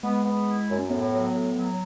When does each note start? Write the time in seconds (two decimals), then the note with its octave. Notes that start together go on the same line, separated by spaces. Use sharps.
0.03 G#3 B3
0.25 B3
0.47 E4
0.68 F#2
0.79 C#4
0.89 A2 B3
1.12 F#3
1.33 A2
1.54 F#3